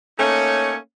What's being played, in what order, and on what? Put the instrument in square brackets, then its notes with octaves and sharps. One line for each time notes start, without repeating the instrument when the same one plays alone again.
[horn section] A3 A#3 C#4 D#4 C#5